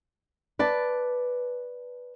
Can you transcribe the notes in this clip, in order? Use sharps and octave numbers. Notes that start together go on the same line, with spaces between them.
B4 D5 A5